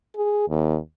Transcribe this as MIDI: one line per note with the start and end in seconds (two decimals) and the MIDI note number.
0.16 0.45 68
0.49 0.78 39